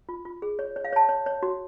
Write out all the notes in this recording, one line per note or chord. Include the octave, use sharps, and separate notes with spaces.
F4
F4
G#4
C#5
C#5
F5
C#5 A5
C#5
C#5
F#4